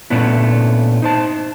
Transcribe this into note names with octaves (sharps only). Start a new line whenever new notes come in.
A#2 A3 B3 C#4 D4 E4
D#4 C5 A5